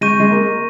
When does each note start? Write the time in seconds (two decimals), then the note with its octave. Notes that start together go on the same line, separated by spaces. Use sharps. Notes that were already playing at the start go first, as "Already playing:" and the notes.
0.01 G#3 C#6 G6 A#6 D#7
0.20 G#3
0.31 A#3